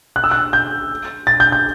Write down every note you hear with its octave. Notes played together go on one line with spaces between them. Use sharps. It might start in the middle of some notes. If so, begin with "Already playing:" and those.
F#6
E6
F#6
G6
A6
G6
G6